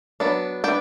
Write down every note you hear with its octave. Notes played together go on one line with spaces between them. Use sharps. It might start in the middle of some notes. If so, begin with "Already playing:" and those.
F#3 B3 D4
B3 D4 G5